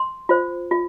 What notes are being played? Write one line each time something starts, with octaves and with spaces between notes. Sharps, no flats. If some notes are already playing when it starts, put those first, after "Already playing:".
Already playing: C6
F4 C5
F4